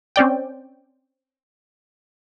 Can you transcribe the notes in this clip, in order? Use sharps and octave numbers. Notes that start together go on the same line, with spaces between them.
C4 C#4 D5 G5